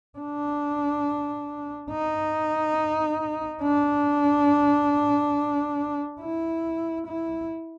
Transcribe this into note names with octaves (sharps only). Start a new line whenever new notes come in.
D4
D#4
D4
E4
E4